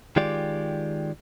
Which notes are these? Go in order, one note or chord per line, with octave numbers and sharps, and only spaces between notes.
D#3 G#3 F4 G4 D5